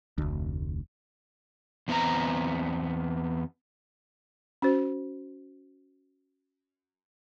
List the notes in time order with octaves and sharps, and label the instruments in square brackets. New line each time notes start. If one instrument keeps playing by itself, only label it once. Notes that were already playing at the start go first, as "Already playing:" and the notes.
[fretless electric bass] F1 D2
[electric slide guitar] E2 B3 C4 E4 D#5 A#5
[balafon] C#4 F#4 C5